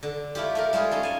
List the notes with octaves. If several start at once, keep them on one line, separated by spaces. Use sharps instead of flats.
D3
A3 E4 F4 G4
A3 G4 A#4
G3 G#3 F4 G#4
C#4 D#4 A4
G#5 A5